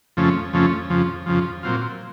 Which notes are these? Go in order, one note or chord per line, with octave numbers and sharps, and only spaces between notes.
F2 C#3 F3 A3 C#4
F2 C#3 F3 A3 C#4
F2 C#3 F3
F2 C#3 F3
A#2 F#3 C4 F4